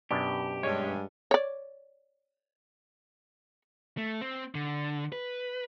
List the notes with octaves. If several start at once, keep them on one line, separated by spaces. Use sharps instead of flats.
F#2 B2 D4 G4
G2 G#3 C#5
C#5 D5
A3
C4
D3
B4